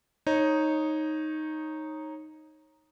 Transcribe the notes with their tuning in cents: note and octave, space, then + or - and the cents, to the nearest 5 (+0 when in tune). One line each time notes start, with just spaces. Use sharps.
D#4 +0 C#5 -20